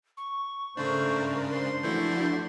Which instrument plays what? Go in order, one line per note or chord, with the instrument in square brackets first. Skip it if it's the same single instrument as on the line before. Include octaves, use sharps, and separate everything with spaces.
[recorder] C#6
[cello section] G#2 A#4 [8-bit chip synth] C#3 D4 [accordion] A3 C5
[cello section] C5 [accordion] C6
[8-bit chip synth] E3 A3 E4 [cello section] F3 D4 F#4 [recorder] G6